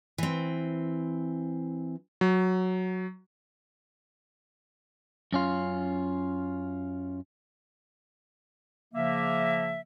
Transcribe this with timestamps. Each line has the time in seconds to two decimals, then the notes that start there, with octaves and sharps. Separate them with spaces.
0.18 E3 C4
2.21 F#3
5.32 F#2 C#4 F4
8.94 C#3 F3 A#3 E5